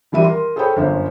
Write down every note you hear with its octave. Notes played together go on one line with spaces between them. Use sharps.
D#3 E3 G3 E5 D#7
A#4 C6
G#4 A4 C5 C#5 G5 B5
G1 F#2 C5